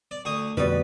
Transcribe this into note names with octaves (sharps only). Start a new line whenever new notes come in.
D5
D2 C#6 D#6
F2 B2 D3 G3 B4